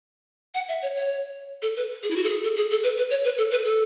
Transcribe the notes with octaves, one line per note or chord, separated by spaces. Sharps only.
F#5
E5
C#5
C#5
A4
B4
G#4
E4
F#4
A4
G#4
A4
G#4
A4
B4
B4
C#5
B4
A4
B4
A4